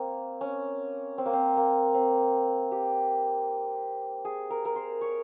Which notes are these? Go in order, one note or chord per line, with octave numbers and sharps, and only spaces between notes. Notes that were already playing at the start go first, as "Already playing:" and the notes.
Already playing: A#3 C4
C#4
C4
A#3
C4
A#3
C4
G4
G#4
A#4
A#4
C5
C#5